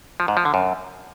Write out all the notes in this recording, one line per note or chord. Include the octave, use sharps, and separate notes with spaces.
F3
G#2
F3
D3
F#2